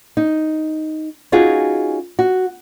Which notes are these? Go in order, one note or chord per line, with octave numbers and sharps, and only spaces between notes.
D#4
C#4 D#4 F4 F#4 G#4
F#4